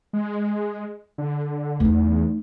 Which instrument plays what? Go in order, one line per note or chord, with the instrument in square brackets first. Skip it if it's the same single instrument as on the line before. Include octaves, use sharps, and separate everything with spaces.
[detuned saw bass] G#3
D3
[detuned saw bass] E2 [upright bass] A3 D#4